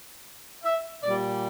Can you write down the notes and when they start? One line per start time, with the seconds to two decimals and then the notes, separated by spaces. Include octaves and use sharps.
0.65 E5
1.03 A#2 G3 D5